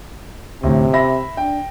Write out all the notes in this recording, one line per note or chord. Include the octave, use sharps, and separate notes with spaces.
D2 A2 C3
E5 B5 A#6
D4 G5